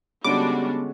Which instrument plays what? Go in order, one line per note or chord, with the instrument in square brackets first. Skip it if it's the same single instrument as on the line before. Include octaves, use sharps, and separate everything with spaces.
[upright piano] D3 G#3 C#4 [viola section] G3 D4 F#4 [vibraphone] B3 [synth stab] D6